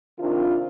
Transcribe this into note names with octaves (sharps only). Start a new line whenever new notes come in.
C3 D#3 D4 F4